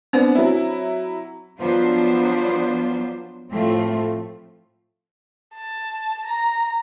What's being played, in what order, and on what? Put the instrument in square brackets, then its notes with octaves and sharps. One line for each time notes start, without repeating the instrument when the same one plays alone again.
[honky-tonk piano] B3 D4 [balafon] C4 C5
[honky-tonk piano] F#3 E4
[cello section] F3 F#3 B3 D4 F4 C5
A2 F3 A3 C4 F4
[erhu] A5
A#5